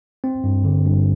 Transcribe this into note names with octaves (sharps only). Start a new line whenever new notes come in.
C4
G2
D3
G2